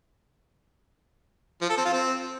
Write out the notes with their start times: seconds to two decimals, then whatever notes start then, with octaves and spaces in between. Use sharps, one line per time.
1.61 F3
1.69 A4
1.77 C4
1.85 F4
1.93 C4